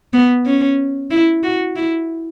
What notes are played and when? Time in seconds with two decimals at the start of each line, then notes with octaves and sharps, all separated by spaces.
0.13 B3
0.46 C#4
1.11 E4
1.43 F#4
1.76 E4